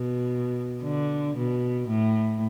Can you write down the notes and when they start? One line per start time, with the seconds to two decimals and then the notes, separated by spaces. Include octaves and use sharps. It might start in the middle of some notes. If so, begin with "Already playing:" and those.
Already playing: B2
0.84 D3
1.37 B2
1.89 A2